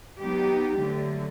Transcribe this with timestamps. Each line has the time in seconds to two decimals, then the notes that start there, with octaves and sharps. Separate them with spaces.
0.20 F#3 B3 D#4 G4
0.81 D2 D3 F#3